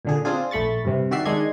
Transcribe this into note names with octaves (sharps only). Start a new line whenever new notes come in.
A#2 D3 G#4
C4 D4 F4 G#4
A#1 A3 B5 C#6 A6
G2 C3
D#3 F#4 G4 D5 E5 C7
D#3 G#3 D4 D#5 C6 G#6